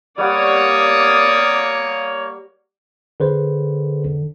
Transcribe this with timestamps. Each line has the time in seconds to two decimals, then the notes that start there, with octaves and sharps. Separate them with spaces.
0.18 G3 A#3 C#5 D5 F#5 D#6
3.20 D3 G#4 B4 C5